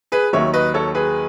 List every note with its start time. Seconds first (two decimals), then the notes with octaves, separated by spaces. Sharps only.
0.12 G#4 B4
0.33 D#2 D#3 F#3 C#5 E5
0.53 B4 D#5
0.74 A4 C#5
0.95 G#4 B4